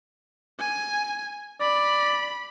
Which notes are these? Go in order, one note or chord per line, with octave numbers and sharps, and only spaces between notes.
G#5
D5 B5